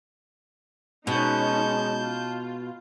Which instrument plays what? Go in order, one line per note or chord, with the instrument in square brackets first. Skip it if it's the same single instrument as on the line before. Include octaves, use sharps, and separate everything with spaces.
[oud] B2 [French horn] G#3 [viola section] C#4 D#4 [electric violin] A5 G6
[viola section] F4